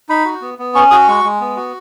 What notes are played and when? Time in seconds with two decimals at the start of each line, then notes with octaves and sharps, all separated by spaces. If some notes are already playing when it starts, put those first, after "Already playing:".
0.09 D#4 B5
0.25 F#4
0.41 B3
0.59 B3
0.75 C#4 C#6
0.91 F#4 D#6
1.08 G#3 C#6
1.24 G#3
1.41 B3
1.56 F#4